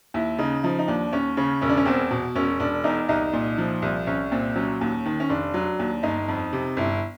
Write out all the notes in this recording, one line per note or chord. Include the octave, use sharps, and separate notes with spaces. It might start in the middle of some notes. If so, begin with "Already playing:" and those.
D#2 E4
C#3 D#4
F3 D#4
D#4
D#2 D4
D#2 C#4
C#3 C#4
E1 C#4
D4
C#4
E2 C4
B2
E1 C#4
E1 D4
E2 D#4
C2 D#4
A#2
F3
C2
C2 C#4
A#2 C4
F#3 C#4
D#2
D#3
C#4
F1 D4
F#3
D#2
G1 D#4
F2
C3
G1 E4